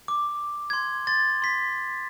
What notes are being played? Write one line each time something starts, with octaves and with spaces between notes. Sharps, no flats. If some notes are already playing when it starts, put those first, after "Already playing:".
D6
C6 G#6
C6 A6
C6 B6